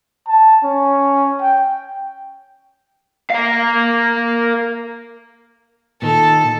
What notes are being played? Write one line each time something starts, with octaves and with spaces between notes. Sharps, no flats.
A5
C#4
G5
A#4 F5
A#2 D#3 A4